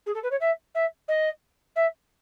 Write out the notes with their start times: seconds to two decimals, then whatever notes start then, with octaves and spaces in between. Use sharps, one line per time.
0.06 G#4
0.14 A4
0.23 B4
0.31 C#5
0.40 E5
0.74 E5
1.08 D#5
1.75 E5